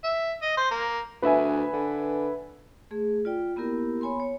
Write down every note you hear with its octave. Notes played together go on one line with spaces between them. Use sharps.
E5
D#5
C5
A#3
D2 B4 E5 G#5
D3
A3 G#4
F4 D5 G5
A#3 B3 E4 G4 A#4
B3 C#5 G#5 B5 C6
C#5